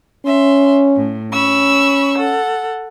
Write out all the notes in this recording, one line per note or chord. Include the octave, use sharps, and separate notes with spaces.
C#4 E5 C6
A2
C#4 B5 C#6 E6
A4 F#5